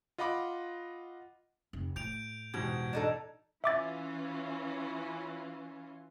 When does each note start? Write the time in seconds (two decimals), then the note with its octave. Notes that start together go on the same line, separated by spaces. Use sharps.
0.18 F4 D#5 F#5 B5 D6
1.73 F1
1.96 A2 G6 D7 F7
2.54 E2 G#2 B2 G4 G#6
2.93 D4 D#4 A4
3.64 E3 C#4 F4 E5 D6 A6